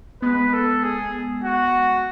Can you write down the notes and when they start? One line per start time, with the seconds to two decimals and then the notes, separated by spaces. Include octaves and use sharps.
0.22 G#3 B3 B4
0.54 A4
0.83 G#4
1.44 F#4